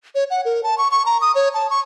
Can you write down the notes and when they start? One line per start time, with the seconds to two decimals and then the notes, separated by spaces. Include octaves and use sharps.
0.15 C#5
0.30 F#5
0.45 A#4
0.64 A5
0.78 C#6
0.91 C#6
1.06 A#5
1.21 D#6
1.35 C#5
1.54 A5
1.70 C#6